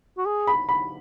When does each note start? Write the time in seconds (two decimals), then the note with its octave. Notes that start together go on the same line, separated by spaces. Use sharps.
0.18 F#4
0.26 G#4
0.47 B5
0.69 B5